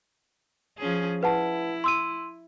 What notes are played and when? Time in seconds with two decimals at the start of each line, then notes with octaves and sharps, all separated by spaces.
0.78 F3 C#4 G#4
1.23 E4 B4 F#5 A5
1.84 C6 E6 D#7